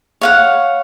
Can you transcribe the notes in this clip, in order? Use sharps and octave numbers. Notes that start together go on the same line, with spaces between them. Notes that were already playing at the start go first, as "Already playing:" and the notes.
C#5 F5 F#5